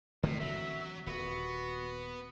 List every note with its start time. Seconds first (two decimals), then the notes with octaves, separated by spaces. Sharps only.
0.23 A2 D3 E3 C4
0.40 F#3 E5
1.07 D#1 B3 F#4